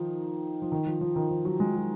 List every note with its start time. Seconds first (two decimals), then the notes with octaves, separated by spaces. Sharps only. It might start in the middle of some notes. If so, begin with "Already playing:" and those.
Already playing: D#3 F3
0.62 F3
0.72 D#3
0.86 F3
1.01 F3
1.16 D#3
1.31 F3
1.45 F#3
1.60 G#3
1.75 F#3